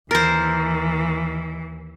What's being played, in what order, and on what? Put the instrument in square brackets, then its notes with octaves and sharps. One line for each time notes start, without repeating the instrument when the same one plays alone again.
[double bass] D#2 [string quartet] E3 [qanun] A#4 C5 [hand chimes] F6 A6 A#6